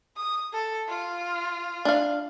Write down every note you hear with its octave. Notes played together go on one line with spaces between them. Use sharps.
D#6
A4
F4
D4 F5